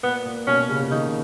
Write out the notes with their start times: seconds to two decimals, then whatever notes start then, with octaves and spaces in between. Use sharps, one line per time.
0.03 A#2 B3
0.25 A#2
0.47 B2 C#4
0.69 C#3
0.83 C#3
0.91 D#3 D#4